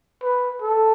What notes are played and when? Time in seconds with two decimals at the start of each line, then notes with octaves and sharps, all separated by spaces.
0.23 B4
0.62 A4